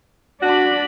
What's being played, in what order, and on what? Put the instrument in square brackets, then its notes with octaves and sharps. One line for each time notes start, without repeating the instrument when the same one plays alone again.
[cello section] D4 [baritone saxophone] F#4 [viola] D5 B5